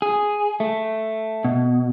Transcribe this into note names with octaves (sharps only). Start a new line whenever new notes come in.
G#4
A3
B2